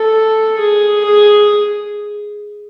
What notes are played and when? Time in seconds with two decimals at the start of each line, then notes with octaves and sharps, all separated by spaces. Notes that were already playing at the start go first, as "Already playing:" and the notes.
Already playing: A4
0.59 G#4
1.05 G#4